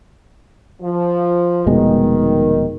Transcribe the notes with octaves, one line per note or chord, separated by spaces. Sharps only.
F3
F1 B2 D#3 G#3